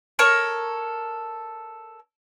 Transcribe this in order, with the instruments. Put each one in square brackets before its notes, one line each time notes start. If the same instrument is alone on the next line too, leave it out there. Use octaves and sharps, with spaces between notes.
[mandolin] A4 A#4 C#5 C#6